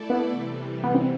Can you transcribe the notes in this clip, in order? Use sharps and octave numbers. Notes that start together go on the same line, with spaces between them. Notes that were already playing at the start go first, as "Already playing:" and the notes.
Already playing: A3 E4 A4 D5
B3
C3 E3 G3
B3
C4